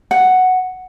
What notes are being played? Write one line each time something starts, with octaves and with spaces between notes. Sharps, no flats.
F#5